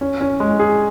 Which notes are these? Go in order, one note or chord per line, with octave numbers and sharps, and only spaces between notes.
C#4
C#4
G#3
G#4